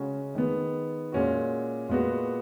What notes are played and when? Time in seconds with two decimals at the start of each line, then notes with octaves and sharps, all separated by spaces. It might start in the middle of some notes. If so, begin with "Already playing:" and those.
Already playing: C#3 G#3 C#4 F#4
0.35 D#3 G#3 B3
1.12 A#2 G#3 C#4 F#4
1.89 A#2 G#3 B3 F#4